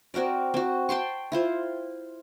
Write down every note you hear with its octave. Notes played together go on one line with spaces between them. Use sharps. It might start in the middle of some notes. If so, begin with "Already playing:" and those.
C4 F#4 A#4 D5
C4 F#4
G5 A5 C6 C#6
E4 F4 C5